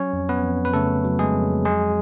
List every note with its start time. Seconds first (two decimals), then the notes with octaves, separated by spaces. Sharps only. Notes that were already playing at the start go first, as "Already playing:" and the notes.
Already playing: F#3 C#4 C#5
0.13 F2
0.29 B3 B4
0.43 F2
0.65 B4
0.73 C#3 A3 A4
1.05 F#3
1.19 G#3 G#4
1.35 F2
1.65 G#3 G#4